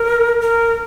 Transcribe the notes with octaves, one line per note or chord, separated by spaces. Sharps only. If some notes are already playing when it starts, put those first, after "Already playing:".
Already playing: A#4
A#4